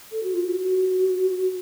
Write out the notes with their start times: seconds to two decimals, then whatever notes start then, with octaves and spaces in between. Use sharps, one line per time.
0.12 A4
0.23 F#4
0.34 F4
0.45 F#4